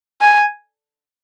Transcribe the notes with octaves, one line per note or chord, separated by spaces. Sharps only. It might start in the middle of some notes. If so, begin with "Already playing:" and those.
G#5